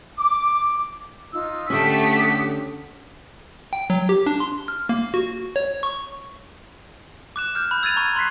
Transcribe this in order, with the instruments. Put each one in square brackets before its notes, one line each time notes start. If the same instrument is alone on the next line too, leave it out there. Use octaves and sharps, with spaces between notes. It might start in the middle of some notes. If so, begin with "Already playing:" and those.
[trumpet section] D6
[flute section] D#4 F4 E6
[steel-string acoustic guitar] D3 C#4 [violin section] A3 G4 B6 [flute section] F#5 D6 D#6
[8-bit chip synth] G5
F#3
G4
D4
C6
F6
A#3
F#4
C#5
C#6
[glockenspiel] D6 F#6 E7
F6 G6
B5 F#6
E6 G#6 A6 D#7 F7
A#5 C#6
C6 F#6 B6 C7